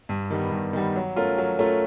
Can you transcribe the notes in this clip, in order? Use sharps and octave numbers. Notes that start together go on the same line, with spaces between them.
G2
D#3 G3 B3
G2
D#3 G3 B3
F#3
A3 C#4 F4 A#4
F#3
A3 C#4 F4 A#4